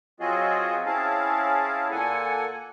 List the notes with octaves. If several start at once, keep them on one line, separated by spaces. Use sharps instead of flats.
F#3 C4 F4 F#4 G#4 D#5
C4 C#4 E4 G#4 F5 A5
A#2 A#3 A4 F#5 G#5